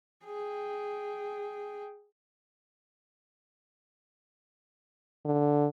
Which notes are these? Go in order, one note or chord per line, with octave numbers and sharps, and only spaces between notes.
G#4 G5
D3